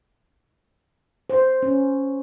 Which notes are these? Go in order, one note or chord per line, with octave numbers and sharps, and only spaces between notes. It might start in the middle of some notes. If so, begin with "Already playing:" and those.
C5
C#4